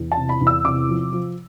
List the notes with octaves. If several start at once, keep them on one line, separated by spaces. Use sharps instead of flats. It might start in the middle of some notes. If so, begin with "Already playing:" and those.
Already playing: E2
A5
C3
B5
E2
E6
C3 D6
F3
F3